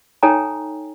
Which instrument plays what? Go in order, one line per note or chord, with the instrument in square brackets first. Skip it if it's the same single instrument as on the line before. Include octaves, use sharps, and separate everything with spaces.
[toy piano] D#4 A4 C#5 G5 G#5 A#5